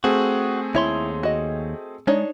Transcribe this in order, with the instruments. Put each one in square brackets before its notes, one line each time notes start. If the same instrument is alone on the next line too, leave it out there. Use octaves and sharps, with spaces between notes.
[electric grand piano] A3 C4 G#4 [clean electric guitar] F#4
[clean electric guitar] D#2 C#5 C6 [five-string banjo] E4
[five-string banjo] F#4 D#5
[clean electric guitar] G#3 [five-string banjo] D4 D#4 C#5